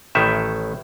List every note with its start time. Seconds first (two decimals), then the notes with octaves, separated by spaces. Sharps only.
0.15 A1 A2 D#3 E5